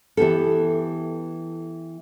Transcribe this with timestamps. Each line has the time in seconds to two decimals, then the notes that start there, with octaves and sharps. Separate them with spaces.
0.17 E3 B3 G4 A4